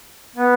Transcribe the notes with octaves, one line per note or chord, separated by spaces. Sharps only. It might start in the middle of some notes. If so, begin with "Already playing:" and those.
B3